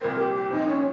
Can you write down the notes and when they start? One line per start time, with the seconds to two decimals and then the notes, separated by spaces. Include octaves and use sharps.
0.01 C2 A#2 F3 C4 A#4
0.19 G4
0.35 G4
0.51 C2 A#2 F3 C4 D#4
0.68 C#4